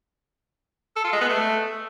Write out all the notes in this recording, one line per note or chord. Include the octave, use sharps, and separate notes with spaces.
A4
F4
G#3
B3
A3